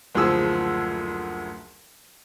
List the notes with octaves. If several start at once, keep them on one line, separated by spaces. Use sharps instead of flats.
F#1 D2 F3 G#4 E6